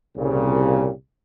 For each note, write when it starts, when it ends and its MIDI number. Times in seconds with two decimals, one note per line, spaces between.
0.17 0.91 36
0.17 0.91 46
0.17 0.91 49
0.17 0.91 67